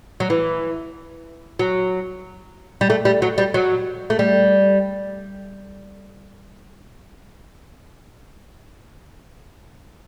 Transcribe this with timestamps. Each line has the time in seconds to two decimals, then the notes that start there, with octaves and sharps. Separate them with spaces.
0.20 F#3
0.30 E3
1.59 F#3
2.81 G3
2.90 A3
3.05 G3
3.22 F#3
3.38 G3
3.54 F#3
4.10 A3
4.19 G3